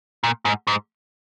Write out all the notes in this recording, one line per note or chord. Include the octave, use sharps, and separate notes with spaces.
A#2
G#2
G#2